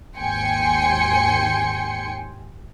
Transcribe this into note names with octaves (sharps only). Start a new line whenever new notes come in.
G#1 D#2 G5 G#5 C6 C#7